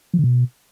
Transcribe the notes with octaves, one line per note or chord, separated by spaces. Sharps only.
F3
D3
B2